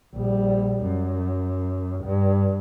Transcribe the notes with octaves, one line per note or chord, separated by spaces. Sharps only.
A#1 G3
F#2
G2